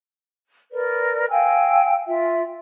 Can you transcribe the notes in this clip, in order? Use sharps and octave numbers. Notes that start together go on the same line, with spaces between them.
A#4 B4 D5
F5 G5 G#5 E6
F4 E5